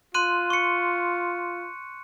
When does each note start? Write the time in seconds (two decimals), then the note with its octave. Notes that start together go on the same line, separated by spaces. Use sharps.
0.14 F4 C6 F#6 D#7
0.50 C#6 C#7